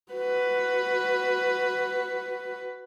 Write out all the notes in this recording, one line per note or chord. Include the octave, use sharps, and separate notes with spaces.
F#4 B4